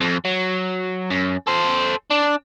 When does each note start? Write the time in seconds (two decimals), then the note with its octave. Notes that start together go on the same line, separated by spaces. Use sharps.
0.01 F2
0.25 F#3
1.11 F#2
1.47 A4 C5
2.10 D4